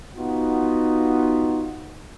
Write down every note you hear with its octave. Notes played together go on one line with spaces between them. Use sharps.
B3 D#4 F4 F#4